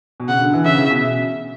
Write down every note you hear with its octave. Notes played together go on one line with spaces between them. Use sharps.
B2
C#3 F#5
D3
E3
C#3 E5
C#3
B2